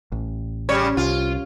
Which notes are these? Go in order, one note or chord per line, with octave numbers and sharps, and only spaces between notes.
A1
C#3 G3 C#5
C2 F4